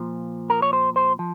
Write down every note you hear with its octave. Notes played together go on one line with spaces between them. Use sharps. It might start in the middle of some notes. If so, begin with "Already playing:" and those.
Already playing: A#2 F3
A#4
C#5
C5
C5
F3